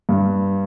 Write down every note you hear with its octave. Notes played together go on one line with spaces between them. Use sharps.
G2